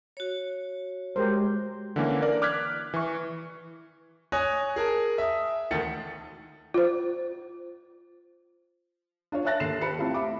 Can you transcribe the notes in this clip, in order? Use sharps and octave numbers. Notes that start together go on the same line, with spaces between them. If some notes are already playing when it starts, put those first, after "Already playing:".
F#4 C#5
G#3 G4 A#4 C5
D3 E3 A#3 C#4
A#4 D5
D6 F6 F#6 G#6 B6
E3 C#6
C#5 G#5 D#6 F#6 A#6
G#4 A#4 A5
E5 D#6
E1 D2 D#3 A3 A6 C#7
F4 C5
D4 F4 C#5
C#5 E5 A5 F#6 A6 A#6
D#2 A4 C7 E7
G4 C5 A#5 B5 C#7
A3 C4 E4 F4 G4
E5 B5 D6